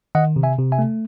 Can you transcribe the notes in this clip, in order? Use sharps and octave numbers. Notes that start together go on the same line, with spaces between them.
D#3 D#5 F#5
C3
E5 G#5
C3
E5 G#5
A3